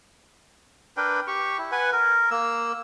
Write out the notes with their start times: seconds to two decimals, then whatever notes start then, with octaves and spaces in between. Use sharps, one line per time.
0.97 D4 A#4 B4 G5
1.27 G4 C#6
1.58 E4
1.72 B4 F#5 G#5
1.92 A#4
2.31 A#3 E6